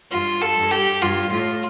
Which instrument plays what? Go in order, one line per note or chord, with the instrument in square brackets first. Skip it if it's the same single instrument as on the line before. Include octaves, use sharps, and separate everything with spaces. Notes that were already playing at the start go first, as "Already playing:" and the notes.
[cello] G2 [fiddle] F4
[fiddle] A4
[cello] G2
[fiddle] G4
[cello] G2 [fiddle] F4
[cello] A2 [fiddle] F4